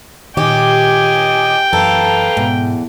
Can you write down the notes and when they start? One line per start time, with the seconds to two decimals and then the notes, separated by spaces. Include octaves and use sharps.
0.37 A#2 D#3 G4 D#5 G5 G#5 D6
1.73 F#2 E3 A4 B4 F5 A#5
2.37 E2 G#2 B2